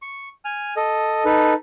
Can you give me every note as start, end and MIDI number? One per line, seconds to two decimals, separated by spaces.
0.02 0.28 85
0.45 0.74 80
0.45 0.74 89
0.77 1.24 69
0.77 1.24 75
1.25 1.53 63
1.25 1.53 69
1.25 1.53 71